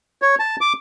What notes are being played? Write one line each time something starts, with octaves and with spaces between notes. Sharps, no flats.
C#5
A5
D6